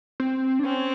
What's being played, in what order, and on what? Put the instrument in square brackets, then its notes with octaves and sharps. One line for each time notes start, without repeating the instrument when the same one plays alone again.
[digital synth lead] C4
D4
[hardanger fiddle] C4 [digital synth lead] C#4